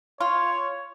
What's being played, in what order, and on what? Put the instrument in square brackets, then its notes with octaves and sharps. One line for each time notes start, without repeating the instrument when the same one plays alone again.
[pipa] F4 [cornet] C#5